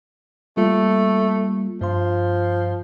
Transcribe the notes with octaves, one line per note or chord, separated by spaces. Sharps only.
G3 A3 A#3 F4
G2 F3 C6